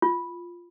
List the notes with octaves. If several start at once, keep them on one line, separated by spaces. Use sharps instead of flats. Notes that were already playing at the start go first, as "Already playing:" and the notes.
F4